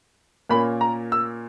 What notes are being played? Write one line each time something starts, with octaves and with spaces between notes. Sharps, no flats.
A#2 A#3 C#4 B5
A#5
E6